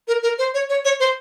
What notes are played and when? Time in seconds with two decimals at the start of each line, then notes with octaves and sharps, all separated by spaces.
0.08 A#4
0.23 A#4
0.38 C5
0.54 C#5
0.69 C#5
0.85 C#5
1.00 C5